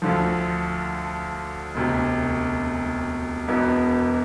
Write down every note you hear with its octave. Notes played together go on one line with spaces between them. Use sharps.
D2 D3 F3
E1 D2 C3
E1 E2 B2 B3